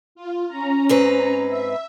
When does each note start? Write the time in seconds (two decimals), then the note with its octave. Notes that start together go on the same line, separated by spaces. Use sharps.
0.15 F4
0.48 C#4 A#5
0.89 G#2 C4 B4
1.46 E5